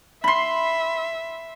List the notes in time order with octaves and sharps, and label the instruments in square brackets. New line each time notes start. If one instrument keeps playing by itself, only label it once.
[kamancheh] E5 [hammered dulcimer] B5 C6